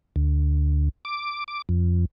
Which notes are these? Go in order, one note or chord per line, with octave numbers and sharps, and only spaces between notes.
D2
D6
D6
F2